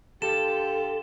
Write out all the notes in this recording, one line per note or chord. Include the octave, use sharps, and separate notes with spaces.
D3 F4 G4 A4 E7